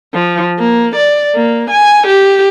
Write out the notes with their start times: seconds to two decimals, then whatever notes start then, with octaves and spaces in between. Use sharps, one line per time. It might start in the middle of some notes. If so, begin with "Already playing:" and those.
0.14 F3
0.59 A#3
0.96 D5
1.35 A#3
1.71 G#5
2.08 G4